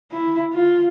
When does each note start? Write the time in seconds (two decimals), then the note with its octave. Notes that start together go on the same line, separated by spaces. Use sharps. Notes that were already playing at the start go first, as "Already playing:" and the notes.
0.12 E4
0.53 F4